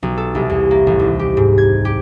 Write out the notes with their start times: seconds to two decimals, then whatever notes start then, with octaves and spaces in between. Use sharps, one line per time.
0.03 B1
0.17 A4
0.35 C2
0.49 E2
0.71 A#3
0.87 A1
0.99 D#2
1.19 G4
1.37 G#2
1.58 G#6
1.85 G4